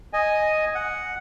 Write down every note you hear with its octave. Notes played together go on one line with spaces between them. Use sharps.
D#5 G#5
F#5